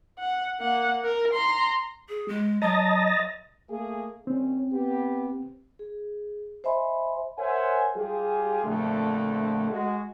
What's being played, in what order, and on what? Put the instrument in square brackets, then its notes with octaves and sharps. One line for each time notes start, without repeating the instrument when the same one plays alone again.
[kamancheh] F#5
A#3 F#5
A#4
A#5 C6
[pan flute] G#4
G#3
[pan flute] F#3 [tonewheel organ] D#5 A5 A#5
[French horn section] A3 A#3 G#4
[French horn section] D#2 G3 C#4 [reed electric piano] C4
[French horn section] B3 G4
[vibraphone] G#4
C5 D#5 E5 G#5 B5 C6
[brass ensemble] A#4 C5 C#5 E5 F#5 G#5
G3 F4 G4 G#4
A#1 F2 D3 A3
G#3 F#4